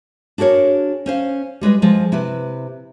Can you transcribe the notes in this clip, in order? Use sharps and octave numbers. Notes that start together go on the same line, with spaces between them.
D4 F#4 G#4 A#4 C#5
C#4 C5 F5
G3 G#3 B4 D#5
F3 G#3
C3 E4 G4 B4